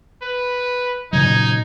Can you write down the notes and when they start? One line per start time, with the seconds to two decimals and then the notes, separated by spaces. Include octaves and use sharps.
0.23 B4
1.13 A#2 C#3 F#3 D#4 G#6